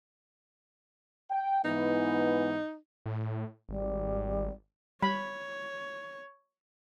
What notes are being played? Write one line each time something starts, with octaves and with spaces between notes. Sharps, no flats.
G5
G#2 E3 B3 D#4
A2
G#1 G3
G3 C#5 B5